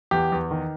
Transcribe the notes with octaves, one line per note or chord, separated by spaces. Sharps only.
E2 G4
E2
D#3